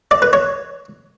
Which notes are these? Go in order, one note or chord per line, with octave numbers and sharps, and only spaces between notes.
D5
B4
C#5